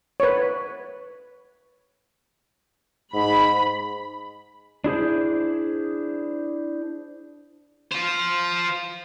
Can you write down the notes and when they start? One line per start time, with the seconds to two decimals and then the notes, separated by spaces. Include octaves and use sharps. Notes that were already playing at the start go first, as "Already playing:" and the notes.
0.20 B4 C#5
3.14 G#2 B5
4.84 D4 E4 G#4 C5
7.92 F4 C5